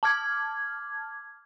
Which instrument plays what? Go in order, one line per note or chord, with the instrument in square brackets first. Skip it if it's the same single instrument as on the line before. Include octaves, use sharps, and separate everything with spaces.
[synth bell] A5 D6 F6 G#6